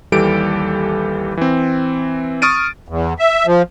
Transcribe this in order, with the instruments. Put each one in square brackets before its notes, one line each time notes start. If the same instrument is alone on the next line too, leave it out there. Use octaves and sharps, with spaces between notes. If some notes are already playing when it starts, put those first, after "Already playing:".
[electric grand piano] D#2 E3 G3 G4 A4 D7
E3 C4
C#6 D#6 F6 A6 D7 D#7
[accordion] E2
E5
F3